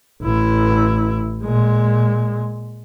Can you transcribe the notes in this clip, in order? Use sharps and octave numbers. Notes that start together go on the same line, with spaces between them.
A1 E4
A#2 G#3